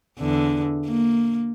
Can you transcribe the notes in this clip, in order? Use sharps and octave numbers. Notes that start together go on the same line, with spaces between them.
E2 D3
A#3